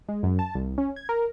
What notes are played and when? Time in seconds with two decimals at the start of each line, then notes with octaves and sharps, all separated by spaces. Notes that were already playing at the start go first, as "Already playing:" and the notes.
0.09 G#3
0.23 F#2
0.39 A5
0.55 C2
0.78 C#4
0.96 G#6
1.09 A#4